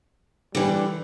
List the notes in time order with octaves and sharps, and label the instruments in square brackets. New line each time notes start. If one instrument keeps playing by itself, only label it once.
[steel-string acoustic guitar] D3 E3 [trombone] G3